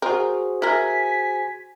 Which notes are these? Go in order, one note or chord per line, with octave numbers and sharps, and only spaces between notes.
F#4 G#4 A#4 C5
E4 A#4 G#5 B6